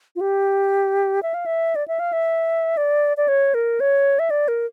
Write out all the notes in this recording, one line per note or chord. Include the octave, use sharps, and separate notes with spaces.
F4
G4
E5
F5
E5
D5
E5
F5
E5
D5
D5
C#5
A#4
C#5
E5
D5
A#4